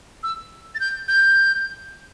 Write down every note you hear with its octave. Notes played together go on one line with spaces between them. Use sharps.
E6
A6
G6
G6